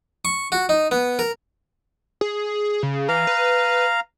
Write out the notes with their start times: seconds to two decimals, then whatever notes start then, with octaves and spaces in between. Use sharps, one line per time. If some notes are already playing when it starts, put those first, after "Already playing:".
0.25 C#6
0.52 F#4
0.69 D#4
0.91 B3
1.19 A#4
2.21 G#4
2.83 C#3
3.09 E3 F5 A#5
3.27 B4